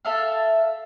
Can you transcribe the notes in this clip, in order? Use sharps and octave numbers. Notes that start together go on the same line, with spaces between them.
A4 E5 F5